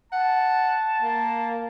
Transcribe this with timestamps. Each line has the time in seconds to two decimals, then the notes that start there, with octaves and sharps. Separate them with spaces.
0.12 F#5 A5
1.01 A#3